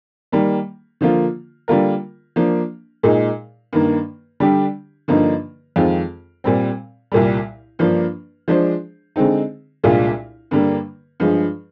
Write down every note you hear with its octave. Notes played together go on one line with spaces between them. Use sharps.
D#3 G3 A#3
D3 F3 A#3 F4
D3 G3 A#3 F4 A#4
F3 A#3 D4
A#2 G#3 D#4
G2 D#3 A#3
D3 G3 D4 G4
G2 D3 F3 A#3 D#4
F2 D#3 G#3 C4 F4
A#2 G3 C4
C2 A#2 G3
G2 F3 A#3 D4
F3 G#3 D4 G#4 C5
D3 G#3 C4 D#4
C2 A#2 G#3 D4 F4
G2 D3 G3 A#3
G2 F3 G#3